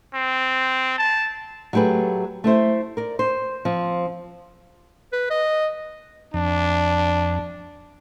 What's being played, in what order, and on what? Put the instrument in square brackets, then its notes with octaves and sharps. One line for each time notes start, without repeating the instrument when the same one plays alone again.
[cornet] C4
A5
[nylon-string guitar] F#3 A3 G4 G#4 B4
A3 E4 C5 E5
A#4 D5
C5
F3 C4
[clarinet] B4
D#5
[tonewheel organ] F2 [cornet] D4